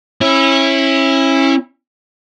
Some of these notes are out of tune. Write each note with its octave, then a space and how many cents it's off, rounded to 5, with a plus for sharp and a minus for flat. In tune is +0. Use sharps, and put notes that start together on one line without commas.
C#4 -30 E4 +0